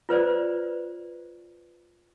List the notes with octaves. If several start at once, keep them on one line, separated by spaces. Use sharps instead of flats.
F4 B4 C5 D5